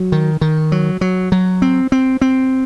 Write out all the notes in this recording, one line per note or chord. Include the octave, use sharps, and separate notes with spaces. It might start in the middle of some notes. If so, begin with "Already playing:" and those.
Already playing: F#3
D#3
D#3
F#3
F#3
F#3
C4
C4
C4